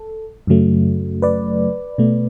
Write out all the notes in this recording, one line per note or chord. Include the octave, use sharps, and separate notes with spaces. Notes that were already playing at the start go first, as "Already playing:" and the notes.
Already playing: A4
F#2 C#3 F#3 A3
B4 D5
B2 A3